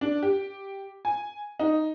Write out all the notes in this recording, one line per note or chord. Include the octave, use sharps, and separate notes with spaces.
D4
G4
G#5
D#4